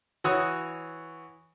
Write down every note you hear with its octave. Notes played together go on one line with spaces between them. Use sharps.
E3 F#4 C#5 D#6